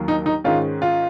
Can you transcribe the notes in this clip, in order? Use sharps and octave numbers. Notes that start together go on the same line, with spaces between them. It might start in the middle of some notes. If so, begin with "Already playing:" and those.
Already playing: D#2 D#3 F#3 A#3
D#4
D#4
G#2 D#3 G#3 C#4 F4
F4